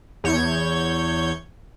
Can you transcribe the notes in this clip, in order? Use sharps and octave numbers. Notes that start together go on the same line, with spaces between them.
E2 C#5 G6 G#6